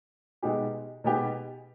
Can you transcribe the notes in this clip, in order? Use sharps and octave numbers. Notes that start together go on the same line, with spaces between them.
B2 G#3 B3 D#4 G4
B2 G#3 B3 D#4 G4